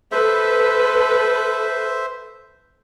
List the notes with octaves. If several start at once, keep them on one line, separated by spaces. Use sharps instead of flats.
A4 B4 C5 E5